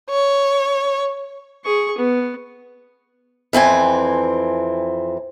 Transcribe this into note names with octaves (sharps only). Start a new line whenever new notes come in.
C#5
G#4 C#6
B3
F2 E3 C4 G#5